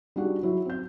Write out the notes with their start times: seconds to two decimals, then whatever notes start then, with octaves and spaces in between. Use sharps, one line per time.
0.16 G3 D4 D#4 F#4 G#4 F#5
0.43 F#3 E4
0.65 C4 G6